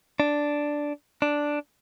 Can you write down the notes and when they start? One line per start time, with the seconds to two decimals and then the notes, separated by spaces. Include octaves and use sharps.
0.20 D4
1.22 D4